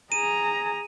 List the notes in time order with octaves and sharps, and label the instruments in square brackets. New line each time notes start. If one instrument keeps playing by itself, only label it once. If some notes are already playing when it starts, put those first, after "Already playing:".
[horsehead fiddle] G#4 A#5 [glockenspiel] D#7